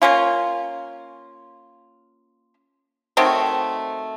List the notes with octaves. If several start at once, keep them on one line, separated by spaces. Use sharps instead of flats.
A#3 C#4 F4
D#3 F#3 A3 C4